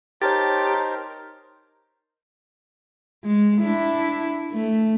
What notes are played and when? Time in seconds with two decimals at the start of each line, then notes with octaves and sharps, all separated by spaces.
0.22 D#4 G4 A#4 C5 C#5 A5 A6
3.25 G#3
3.62 D4 E4
4.52 A3